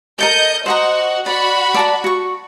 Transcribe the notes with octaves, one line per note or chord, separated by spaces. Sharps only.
G4 A4 A#4 D#5 G6
F#4 C5 D#5 F#5 A#5
F#4 D5 F#5 B5
D5 A5 A#5
F#4 C#6